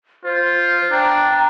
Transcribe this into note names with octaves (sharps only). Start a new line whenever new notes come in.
F4 C5
D4 G5 A#5